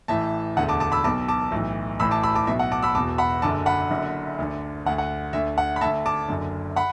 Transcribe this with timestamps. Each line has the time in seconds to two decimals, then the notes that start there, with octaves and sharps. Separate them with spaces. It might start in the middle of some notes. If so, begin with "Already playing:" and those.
0.08 A1 A2 E3 E5 A5
0.56 E1 D2 D3 F#5
0.69 A5 D6
0.80 A5 D6
0.92 B5 E6
1.04 B1 B2 A5 D6
1.28 A5 D6
1.52 B1 A2 E3
2.00 A1 A2 E3 B5 E6
2.11 A5 D6
2.23 B5 E6
2.35 A5 D6
2.47 B1 B2 E5
2.59 F#5
2.71 A5 D6
2.83 B5 E6
2.95 E1 E2 B2 A5 D6
3.18 F#5 B5
3.42 F#1 F#2 D3 A5 D6
3.66 F#5 B5
3.90 F#1 F#2 D3
4.38 D2 D3
4.85 D2 D3 F#5
4.98 F#5
5.33 D2 D3 E5
5.58 F#5
5.76 B5
5.81 D2 D3 E5 A5
6.06 A5 D6
6.28 F#1 F#2 D3
6.76 F#5 B5